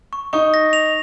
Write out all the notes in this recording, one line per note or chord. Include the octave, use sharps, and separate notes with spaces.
C#6
D#4 C#6
A#6
F7